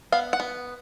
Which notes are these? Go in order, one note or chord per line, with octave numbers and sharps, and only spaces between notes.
B3 F5
F#5
B3